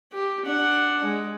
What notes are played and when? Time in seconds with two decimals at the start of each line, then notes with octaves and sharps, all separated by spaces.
0.13 G4
0.45 D4 F#5
1.03 G#3